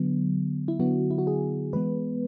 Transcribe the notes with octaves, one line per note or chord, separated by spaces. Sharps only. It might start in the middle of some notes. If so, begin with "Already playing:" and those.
Already playing: D3 F#3 B3
E4
D3 F#3 B3 F#4
E4
F#4
G#4
E3 G#3 B3 B4